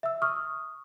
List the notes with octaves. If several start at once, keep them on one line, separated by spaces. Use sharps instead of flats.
E5 E6
C#6 D#6 F6